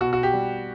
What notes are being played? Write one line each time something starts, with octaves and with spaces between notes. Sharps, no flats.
B2 F#4
F#4
G4
G3